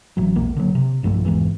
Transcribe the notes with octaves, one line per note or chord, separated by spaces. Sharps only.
A1 F#3
E1 A#1 A#3
D3 F#3
C3
B1 G2 F3 A3
G#1 E2 G#2 E3